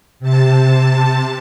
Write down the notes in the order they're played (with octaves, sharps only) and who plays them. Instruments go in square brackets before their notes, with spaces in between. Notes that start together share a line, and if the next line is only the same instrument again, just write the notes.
[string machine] C3 A5